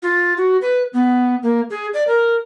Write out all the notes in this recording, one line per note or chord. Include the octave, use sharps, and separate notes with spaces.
F4
F#4
B4
B3
A#3
G#4
D5
A#4